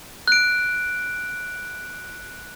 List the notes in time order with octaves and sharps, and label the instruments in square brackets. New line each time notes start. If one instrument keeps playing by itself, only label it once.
[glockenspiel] F#6 D7